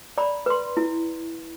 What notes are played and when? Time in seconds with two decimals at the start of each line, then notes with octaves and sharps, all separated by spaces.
0.18 D5 A#5 B5
0.46 B4 C6
0.77 E4